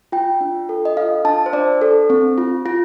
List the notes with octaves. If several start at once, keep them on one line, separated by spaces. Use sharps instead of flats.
F4 G5
D4
A4
D#5
F4 F5
D4 A5
C5
D4 D5
A4
C4
F4
F4